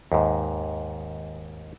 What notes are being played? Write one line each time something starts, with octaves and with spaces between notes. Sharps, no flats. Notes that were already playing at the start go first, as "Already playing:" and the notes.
D#2 G#2